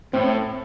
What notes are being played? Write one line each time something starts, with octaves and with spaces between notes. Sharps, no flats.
A2 C4